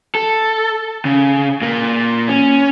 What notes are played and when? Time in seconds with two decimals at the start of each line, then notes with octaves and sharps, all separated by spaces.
0.15 A4
1.05 C#3
1.62 A#2 A#3
2.28 C#4